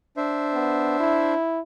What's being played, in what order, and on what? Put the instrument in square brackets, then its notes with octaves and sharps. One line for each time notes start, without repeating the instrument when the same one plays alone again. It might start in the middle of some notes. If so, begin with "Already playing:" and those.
[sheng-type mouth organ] D4 C5 E5
[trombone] B3
E4